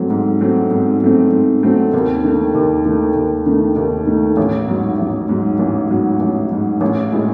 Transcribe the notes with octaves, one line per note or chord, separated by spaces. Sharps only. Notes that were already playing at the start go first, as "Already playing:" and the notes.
Already playing: G#2 F#3 A3 C4
G#2
F#3 A3 C4
G#2
F#3 A3 C4
G#2
F#3 A3 C4
D#2
D#3 A3
D#2
D#3 A3
D#2
D#3 A3
D#2
D#3 A3
A1
G#2 F#3
A1
G#2 F#3
A1
G#2 F#3
A1
G#2 F#3
A1
A2 G#3